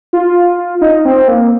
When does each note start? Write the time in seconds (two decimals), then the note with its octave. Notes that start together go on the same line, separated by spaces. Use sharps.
0.13 F4
0.81 D#4
1.05 C4
1.28 A#3